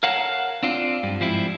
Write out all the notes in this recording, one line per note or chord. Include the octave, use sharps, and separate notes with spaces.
A#4 C#5 F5 F#5 A5 A#5
C4 D4 F4
G2
G#2 F3 G3 C4 E4